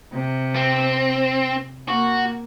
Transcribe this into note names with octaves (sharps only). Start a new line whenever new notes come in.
C3
C4
A#3 F#4